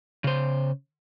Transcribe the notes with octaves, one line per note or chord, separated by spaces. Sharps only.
C#3 C5